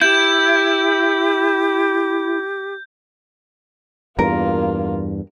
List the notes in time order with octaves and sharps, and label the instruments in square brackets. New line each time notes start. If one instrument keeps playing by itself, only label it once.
[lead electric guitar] E4 [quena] G4 [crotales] G6
[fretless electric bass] E2 G2 [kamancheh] A#3 F4 [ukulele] A#4